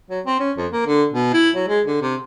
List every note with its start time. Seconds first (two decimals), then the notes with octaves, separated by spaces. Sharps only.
0.10 F#3
0.26 C4
0.40 C#4
0.58 F2
0.72 A#3
0.86 D3
1.13 B2
1.33 E4
1.55 F#3
1.68 G#3
1.86 D3
2.02 C3